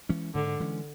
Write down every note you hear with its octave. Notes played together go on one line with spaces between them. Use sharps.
E3 G#3 C#4
G#2 D3
E3 G#3 C#4